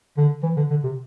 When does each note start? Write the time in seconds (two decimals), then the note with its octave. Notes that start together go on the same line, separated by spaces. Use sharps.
0.17 D3
0.43 E3
0.57 D3
0.70 D3
0.84 C3